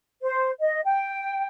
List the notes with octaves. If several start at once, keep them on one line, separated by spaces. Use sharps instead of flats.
C5
D#5
G5